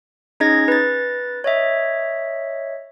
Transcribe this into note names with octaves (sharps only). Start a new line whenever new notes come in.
C#4 D#4 G#4 D#5 G#6 A#6
B4 A6
C#5 D#5 E5